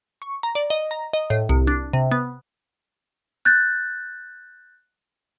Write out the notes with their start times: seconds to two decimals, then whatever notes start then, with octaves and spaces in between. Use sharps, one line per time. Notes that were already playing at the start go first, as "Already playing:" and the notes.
0.22 C#6
0.43 A#5
0.55 D5
0.70 D#5
0.91 A#5
1.13 D#5
1.30 A2
1.49 C2
1.67 D4
1.93 C3
2.12 B3
3.45 F#6 G6 A6